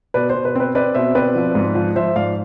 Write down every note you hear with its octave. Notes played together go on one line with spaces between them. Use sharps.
B2 B4 D5
C5
B2
B4
C4 B4
C4 B4 D5
B2 C5 E5
C4 B4 D5
F3
G#2
F3
F3 C5 E5
G#2 D5 F5